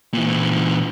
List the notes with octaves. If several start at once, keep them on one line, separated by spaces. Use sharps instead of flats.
A#2 E3